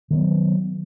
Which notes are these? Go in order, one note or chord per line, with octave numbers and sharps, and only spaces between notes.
D#3 F#3 G#3 B3